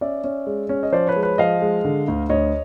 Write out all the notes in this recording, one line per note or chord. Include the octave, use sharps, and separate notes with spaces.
C#4 D5 E5
C#4
G#3
C#4
D#5
F3 C5 D5
B4 C#5
G#3
B4 C#5
F3 D#5 F5
G#3
D3
D2
D2 C#5 D#5